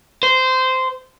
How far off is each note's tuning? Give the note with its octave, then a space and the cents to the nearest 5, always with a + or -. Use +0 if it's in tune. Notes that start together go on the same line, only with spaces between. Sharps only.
C5 -15